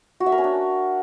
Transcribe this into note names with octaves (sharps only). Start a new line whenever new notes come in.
F#4
E5
A#4
C#4
D4